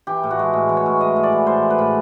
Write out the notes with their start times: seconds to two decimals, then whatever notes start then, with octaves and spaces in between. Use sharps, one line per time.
0.07 E3 G4
0.23 A2
0.31 F#4
0.39 G#3
0.53 A2
0.69 E3
0.77 C#5
0.86 A2
1.01 G#3 D#5
1.16 A2
1.23 D5
1.32 E3
1.47 A2 C5
1.63 G#3
1.70 B4
1.79 A2